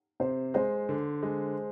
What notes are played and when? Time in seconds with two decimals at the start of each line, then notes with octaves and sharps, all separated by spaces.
0.20 C3 C5
0.54 G#3 C5
0.89 D3
1.23 G#3